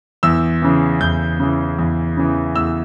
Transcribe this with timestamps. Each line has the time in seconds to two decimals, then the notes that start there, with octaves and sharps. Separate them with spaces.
0.23 E2 E6
0.62 C#3 E3
1.01 E2 G6
1.39 C#3 E3
1.79 E2
2.17 C#3 E3
2.55 E2 E6